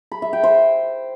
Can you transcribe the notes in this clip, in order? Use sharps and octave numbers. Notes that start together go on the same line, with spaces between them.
B5
E5
G5
C5